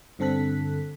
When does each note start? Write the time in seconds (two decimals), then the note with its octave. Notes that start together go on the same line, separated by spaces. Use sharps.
0.19 G2 D3 C4 A4 F#6 B6